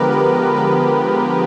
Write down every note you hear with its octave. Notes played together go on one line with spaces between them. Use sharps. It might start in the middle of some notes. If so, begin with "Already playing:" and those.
Already playing: D3 F3 G#3 B3 G4 A#4 B4
A#4
B4